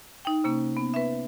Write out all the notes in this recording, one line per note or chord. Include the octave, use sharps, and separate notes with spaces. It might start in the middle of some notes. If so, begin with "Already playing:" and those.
D#4 G5
C3 A#3 C#4
B3
B4 E5